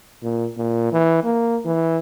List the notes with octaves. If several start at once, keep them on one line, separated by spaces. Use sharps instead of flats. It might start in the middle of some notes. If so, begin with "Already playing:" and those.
A#2
A#2
E3
A#3
E3